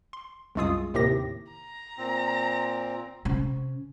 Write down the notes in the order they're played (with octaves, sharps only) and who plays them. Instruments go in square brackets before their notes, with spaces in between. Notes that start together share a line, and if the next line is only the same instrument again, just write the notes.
[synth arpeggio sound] C6
C2 F#2 G#3 F4 G#4 D#6
D#2 A2 C3 D#3 G4 A#6
[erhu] A#5
[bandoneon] A#2 C4
[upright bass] C3 C#4